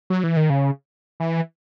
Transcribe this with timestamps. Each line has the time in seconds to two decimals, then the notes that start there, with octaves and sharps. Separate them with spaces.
0.10 F#3
0.24 E3
0.37 D#3
0.50 C#3
1.20 E3